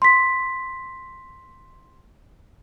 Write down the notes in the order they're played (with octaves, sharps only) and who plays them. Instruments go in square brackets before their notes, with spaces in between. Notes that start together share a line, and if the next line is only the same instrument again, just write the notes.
[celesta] C6 B6